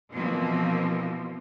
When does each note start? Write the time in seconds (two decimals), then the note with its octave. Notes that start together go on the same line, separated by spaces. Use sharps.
0.11 B2 E3 F3 A#3 C4